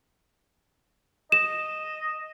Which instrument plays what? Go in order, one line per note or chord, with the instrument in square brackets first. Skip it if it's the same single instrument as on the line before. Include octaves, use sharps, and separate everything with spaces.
[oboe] D#5 [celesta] E7